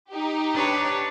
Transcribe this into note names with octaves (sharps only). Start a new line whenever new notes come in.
D#4 G4
D4 B4 C#5